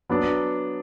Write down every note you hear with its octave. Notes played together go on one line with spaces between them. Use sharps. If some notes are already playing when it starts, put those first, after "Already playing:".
F#3 B3 D4